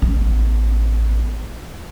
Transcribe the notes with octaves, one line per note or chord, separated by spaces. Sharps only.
A1 B3